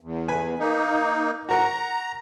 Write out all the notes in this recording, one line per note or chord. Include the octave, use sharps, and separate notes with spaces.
E2
B4 G#5
A#3 D#4
F#4 A#4 F#5 A#5